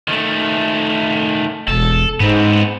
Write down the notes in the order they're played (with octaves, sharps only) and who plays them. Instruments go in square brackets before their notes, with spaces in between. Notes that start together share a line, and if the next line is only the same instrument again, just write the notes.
[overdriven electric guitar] D#3 A3
[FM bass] E1 [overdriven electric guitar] A4
[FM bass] G#2 [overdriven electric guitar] B3 C4